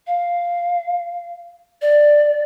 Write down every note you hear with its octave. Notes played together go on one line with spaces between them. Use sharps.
F5
D5